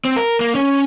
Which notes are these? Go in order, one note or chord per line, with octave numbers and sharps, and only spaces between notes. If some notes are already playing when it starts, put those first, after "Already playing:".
C4
A#4
A#3
C#4